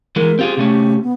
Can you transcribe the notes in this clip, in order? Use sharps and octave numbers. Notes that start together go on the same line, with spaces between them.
E3 G#3 A#4
C4 F4 G4 G#4
C3 A3 C#4
B3